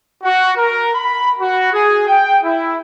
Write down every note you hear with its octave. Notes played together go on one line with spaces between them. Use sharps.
F#4
A#4
B5
F#4
G#4
G5
E4